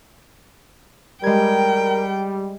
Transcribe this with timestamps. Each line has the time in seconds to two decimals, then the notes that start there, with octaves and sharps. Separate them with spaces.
1.23 G3 G#3 A#4 G5 G#6